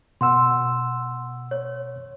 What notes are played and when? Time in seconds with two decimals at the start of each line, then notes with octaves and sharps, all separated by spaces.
0.21 B2 F#5 C6 E6
1.51 C#5